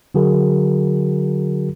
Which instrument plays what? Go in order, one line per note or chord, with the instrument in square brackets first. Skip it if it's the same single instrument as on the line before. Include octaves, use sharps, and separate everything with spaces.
[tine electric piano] D3 F#3 F#4 G#4 A#4